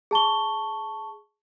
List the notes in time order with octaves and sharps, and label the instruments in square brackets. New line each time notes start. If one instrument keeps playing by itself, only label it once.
[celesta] G#4 A5 C#6 G7